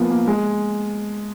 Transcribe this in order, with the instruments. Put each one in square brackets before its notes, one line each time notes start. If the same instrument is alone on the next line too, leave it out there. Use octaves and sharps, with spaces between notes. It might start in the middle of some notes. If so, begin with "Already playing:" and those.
Already playing: [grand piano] F3 A#3 B3
A#3
G#3